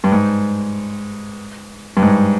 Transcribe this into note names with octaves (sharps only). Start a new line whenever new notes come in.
G2
G#2
G2
G#2